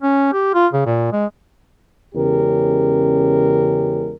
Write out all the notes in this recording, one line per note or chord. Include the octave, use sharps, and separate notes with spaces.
C#4
G4
F4
C#3
A#2
G#3
E2 C#3 G#3 C#4 G4 A#4